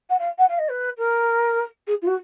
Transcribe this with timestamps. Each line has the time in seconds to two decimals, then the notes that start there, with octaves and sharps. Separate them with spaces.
0.09 F#5
0.19 F5
0.38 F#5
0.48 F5
0.58 D#5
0.69 B4
0.98 A#4
1.87 G#4
2.02 F4
2.07 F#4